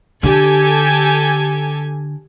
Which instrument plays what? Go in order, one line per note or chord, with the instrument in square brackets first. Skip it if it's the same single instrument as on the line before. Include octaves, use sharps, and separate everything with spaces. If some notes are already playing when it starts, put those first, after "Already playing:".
[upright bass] D3 [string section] G4 A4 G#5